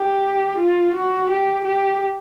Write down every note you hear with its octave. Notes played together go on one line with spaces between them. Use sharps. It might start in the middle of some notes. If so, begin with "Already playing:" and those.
Already playing: G4
F4
F#4
G4
G4